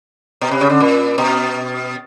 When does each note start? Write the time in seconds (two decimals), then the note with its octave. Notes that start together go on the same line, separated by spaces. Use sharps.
0.41 B2
0.51 C3
0.61 C#3
0.70 D3
0.80 A#2
1.18 B2